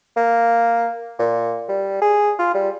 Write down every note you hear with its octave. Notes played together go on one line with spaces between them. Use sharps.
A#3
A#2
G3
G#4
F4
G3